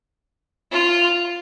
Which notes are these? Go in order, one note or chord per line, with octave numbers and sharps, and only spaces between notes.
F4